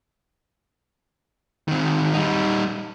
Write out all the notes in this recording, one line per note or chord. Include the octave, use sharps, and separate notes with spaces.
D#3 C4
G3 D#4